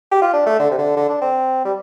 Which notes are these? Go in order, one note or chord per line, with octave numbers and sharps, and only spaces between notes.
G4
F4
D4
A3
D3
C3
D3
D3
D4
C4
G3